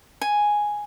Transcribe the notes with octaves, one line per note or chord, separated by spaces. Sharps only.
G#5